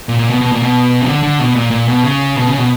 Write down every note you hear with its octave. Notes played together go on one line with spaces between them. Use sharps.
A#2
A#2
B2
B2
A#2
B2
C#3
D3
D3
B2
A#2
A#2
B2
C#3
B2
C#3
B2